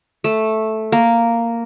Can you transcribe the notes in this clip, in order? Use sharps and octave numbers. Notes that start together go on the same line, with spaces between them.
A3
A#3